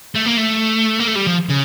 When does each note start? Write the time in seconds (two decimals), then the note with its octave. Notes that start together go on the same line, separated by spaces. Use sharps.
0.16 A3
0.26 A#3
0.38 A3
1.00 A#3
1.08 A3
1.16 G3
1.27 F3
1.50 C#3